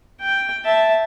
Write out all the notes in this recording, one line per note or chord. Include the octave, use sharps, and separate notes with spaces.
G5
E5 A5